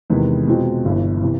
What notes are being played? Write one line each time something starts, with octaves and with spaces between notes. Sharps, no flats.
E2 C3 D#3 G#3 B3
B2 G#3 C4 F4
G1 G2 E3
C3 E3